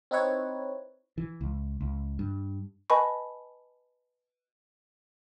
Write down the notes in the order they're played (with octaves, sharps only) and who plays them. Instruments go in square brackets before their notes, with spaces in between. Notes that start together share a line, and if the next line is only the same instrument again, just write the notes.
[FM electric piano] C4 D#4 E4 B4 C#5
[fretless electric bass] E3
C#2
C#2
G2
[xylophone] B4 D#5 G#5 A5 B5 C#6